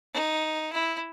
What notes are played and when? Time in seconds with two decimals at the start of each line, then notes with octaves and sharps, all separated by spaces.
0.14 D#4
0.73 E4